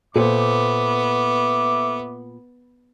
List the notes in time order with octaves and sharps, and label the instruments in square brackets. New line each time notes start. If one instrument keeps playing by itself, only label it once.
[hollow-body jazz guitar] A#2 [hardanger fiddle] B3 [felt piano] A4 C5 [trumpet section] E5 D6